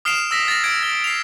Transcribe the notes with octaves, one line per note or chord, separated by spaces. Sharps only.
D#6 F6 C7 D7 E7 F7
E6 A#6 B6
A6 A#6
G#6 D7
A#6 G7
C7 F7